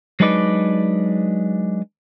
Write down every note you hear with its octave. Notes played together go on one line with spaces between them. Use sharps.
F#3 G#3 D4 D#4 B4 D5